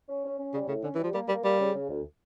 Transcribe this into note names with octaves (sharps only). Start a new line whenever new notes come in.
C#4
C#4
C#4
C#3 G3
A2 C#3
D3 C#4
E3
G3
F3
G3 A#3
G3 A#3
G3 A#3
C#3
C#3
D2